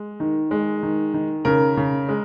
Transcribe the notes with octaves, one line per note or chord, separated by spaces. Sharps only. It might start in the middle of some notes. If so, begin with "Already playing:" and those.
Already playing: G#3
D#3
G#3
D#3
D#3
C#3 A#4
C#3
G#3